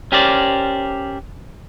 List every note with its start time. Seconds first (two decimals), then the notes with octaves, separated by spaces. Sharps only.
0.12 C#4 G4 A#4 C5 D5